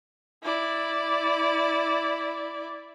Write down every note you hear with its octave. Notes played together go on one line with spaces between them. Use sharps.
E4 D5